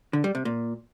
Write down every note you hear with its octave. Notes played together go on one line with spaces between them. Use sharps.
D3
G3
C3
A#2